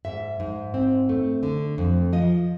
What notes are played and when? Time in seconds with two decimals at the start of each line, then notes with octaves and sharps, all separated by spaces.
0.05 G#2 E5
0.40 G#2
0.74 C4
1.09 A3
1.43 D3
1.78 F2
2.13 F3 D#5